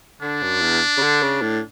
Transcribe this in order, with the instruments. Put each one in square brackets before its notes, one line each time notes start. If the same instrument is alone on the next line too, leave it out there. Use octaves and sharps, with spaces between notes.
[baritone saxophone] D3 [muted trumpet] D4
[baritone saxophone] F#2
E2
C#3
D3
C#3
A2